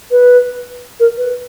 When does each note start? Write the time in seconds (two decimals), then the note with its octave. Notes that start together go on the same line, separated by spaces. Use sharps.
0.11 B4
1.00 A#4
1.17 B4